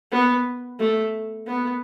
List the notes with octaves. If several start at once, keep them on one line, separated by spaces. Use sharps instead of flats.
B3
A3
B3